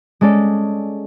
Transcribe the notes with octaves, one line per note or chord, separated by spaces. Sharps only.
G#3 C#4 A4 D5